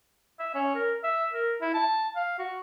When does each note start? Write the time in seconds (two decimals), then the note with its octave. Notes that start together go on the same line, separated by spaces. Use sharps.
0.39 E5
0.54 C#4
0.75 A#4
1.03 E5
1.32 A#4
1.61 E4
1.74 A5
2.16 F5
2.39 F#4